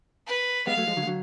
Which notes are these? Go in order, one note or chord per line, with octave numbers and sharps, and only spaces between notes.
B4
G#3 B3 F5
F#3 A3
F3 G#3
D3 F#3
G#3
D3 F#3